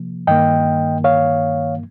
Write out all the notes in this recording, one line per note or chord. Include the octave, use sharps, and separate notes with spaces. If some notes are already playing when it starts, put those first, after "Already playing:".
Already playing: C3 F3 A#3
G2 D#3 A#3 D#5 G5
C#5 F5